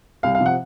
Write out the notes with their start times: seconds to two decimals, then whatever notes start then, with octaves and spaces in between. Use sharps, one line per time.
0.23 C2 F5
0.35 F5
0.40 C3 F3
0.46 F#5